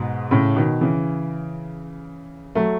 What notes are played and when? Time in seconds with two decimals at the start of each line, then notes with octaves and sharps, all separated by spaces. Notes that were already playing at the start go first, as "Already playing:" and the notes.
Already playing: G#2 B2
0.31 A2 C#3
0.56 B2 D#3
0.81 C#3 E3
2.55 F#3 A3